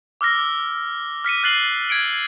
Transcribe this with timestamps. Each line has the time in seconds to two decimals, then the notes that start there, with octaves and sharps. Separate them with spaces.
0.21 D6 E6 F6 A#6
1.25 F6 B6 C#7 D#7
1.43 F6 F#6 A6 C7 F#7 G7
1.89 G#6 C#7 D7 G7